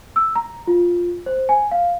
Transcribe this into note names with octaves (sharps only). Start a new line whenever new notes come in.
E6
A#5
F4
C5
G#5
F5